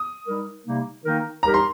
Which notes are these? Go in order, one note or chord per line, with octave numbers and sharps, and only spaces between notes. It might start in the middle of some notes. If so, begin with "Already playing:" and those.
Already playing: D#6
G3 D#4 A#4
C3 G3 A#3 D#4
D#3 A#3 D#4 A#4
G3 D#4 G4 A#4 A#5
C6